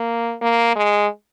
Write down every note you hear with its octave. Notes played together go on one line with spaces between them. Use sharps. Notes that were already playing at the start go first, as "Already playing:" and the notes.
Already playing: A#3
A#3
G#3